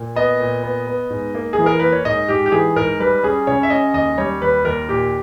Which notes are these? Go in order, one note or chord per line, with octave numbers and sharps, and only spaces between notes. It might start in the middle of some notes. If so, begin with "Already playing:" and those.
Already playing: A#2
B3 D#5
A#2
B3
B3
G#2
A#3
G#4
E3
A#4
A#3 B4
C#5
G#2 D#5
G#2 G4
G4
E3 G#4
G#2 A#4
G3 B4
C#4 G#4
C#3 C#5
E5
C#4 D#5
D#2 D#5
G3 C#5
D#2 B4
D#2 A#4
A#2 G4